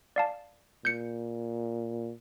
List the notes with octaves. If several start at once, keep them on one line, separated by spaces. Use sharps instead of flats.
D5 F5 A5
A#2 G6 C#7